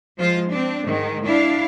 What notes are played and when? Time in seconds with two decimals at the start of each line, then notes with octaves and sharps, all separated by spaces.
0.17 F3 G#3 F4 C5
0.49 C4 D4
0.84 G#2 D#3 G#3
1.24 D4 E4 F5